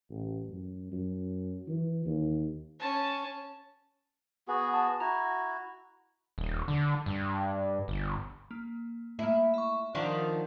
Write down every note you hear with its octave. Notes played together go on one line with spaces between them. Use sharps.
A1
F#2
F#2
E3
D#2
C#4 A5
B3 F#4 G#4
A5
E4 F#4 A#5
D#1
D3
G2
G1
A#3
A3 A#3 E4
E5 C#6
D#3 F3 D4 D5 F#5 C6